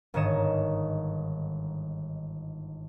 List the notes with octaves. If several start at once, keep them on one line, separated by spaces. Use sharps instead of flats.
G1 G#2 D#3 C#5 D#5 E7